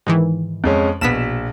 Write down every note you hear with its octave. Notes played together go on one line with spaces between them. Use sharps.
G#2 D#3 E3
F2 G#3 C#4
A#1 B2 B6 E7